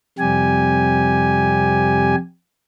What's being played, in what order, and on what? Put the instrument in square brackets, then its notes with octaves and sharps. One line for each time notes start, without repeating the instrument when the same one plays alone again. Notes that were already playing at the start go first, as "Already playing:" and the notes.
[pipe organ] F2 C3 G3 G4 G#5